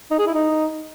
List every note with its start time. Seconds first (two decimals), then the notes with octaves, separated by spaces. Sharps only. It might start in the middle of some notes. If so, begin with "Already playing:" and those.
0.11 D#4
0.19 G#4
0.27 E4
0.34 D#4